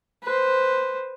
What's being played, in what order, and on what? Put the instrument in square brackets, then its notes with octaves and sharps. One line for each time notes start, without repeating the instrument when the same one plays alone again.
[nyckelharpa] B4 C5